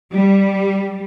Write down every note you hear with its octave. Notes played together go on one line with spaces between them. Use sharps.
G3